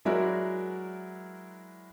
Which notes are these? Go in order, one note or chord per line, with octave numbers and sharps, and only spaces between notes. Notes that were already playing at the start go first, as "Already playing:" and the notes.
F#3 G#3 E4 F#4 A#4 D5